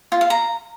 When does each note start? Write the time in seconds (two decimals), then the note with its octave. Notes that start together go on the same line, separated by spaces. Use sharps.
0.12 F4
0.21 F5
0.30 A#5